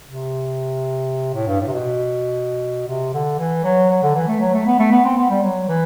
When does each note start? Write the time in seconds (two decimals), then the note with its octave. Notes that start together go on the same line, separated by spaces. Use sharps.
0.08 C3
1.34 A2
1.47 G2
1.61 A2
1.67 C3
1.73 B2
2.87 C3
3.14 D3
3.38 E3
3.64 F#3
3.90 F#3
4.03 D3
4.15 E3
4.28 A3
4.40 F#3
4.54 A3
4.67 B3
4.79 A3
4.92 B3
5.05 C4
5.17 B3
5.30 G3
5.43 F#3
5.69 E3